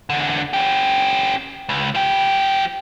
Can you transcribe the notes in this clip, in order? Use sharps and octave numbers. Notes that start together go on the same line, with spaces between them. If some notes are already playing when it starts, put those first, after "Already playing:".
E2 D3
C#4 G4
C#2
F3 G4